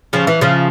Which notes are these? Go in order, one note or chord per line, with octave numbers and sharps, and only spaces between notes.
C#3 F3
E3
C#3 F3